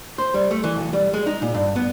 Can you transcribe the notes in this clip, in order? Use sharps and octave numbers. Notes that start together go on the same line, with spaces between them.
C5
G3
A3
E3
B1
G3
G#3
D#4
A#2
G2
B3